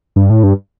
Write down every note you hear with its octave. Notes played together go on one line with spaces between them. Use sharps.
G2
A2
G2